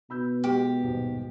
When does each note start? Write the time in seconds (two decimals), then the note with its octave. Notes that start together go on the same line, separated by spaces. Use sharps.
0.10 B2 B5 E6 G6
0.44 G#3 B3 G4
0.82 D#1 B1 G#2